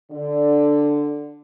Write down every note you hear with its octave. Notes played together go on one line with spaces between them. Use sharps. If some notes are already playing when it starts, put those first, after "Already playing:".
D3